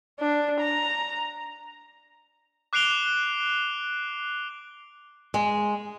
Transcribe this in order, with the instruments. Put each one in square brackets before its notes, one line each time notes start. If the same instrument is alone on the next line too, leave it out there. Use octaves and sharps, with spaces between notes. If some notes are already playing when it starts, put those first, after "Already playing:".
[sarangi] D4
A#5
[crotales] D6 F#6 C7 D7 F7 G7
[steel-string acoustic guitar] G#3